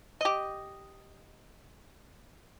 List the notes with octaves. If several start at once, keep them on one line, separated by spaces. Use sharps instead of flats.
G4 D#5